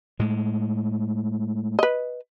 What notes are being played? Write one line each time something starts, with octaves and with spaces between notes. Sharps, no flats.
A2 G#3
B4 D#5